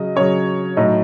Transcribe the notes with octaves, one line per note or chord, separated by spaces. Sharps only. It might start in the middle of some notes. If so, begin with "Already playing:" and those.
Already playing: C#3 F#3 D#5
C#3 F#3 C#5
A2 F#3 D#4